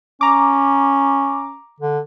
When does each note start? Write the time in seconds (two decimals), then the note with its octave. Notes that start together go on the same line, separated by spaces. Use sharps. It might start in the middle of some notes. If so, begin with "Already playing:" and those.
0.21 C#4 A#5 D6
1.80 D3